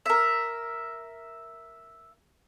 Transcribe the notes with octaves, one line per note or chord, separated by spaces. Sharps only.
A#4 E5